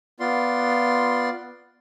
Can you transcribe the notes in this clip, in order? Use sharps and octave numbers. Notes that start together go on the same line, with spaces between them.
B3 F4 D5 C6